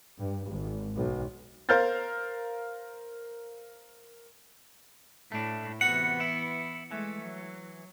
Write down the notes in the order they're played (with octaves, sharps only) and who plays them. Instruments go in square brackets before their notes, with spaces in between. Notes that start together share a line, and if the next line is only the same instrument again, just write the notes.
[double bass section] G2
G#1
B1
[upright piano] A#4 C5 F5 F6 G6 A6
[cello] A2 [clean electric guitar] A3 D4
[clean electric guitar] C3 F#4 F#5 [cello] E3 B3 [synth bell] C#7
[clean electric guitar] E4
[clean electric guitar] E3 [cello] G#3 A3
[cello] F#3